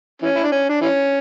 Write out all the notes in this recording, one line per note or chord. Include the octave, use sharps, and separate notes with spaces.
E3 C#4
E4
D4
C#4
D4
E3 C#4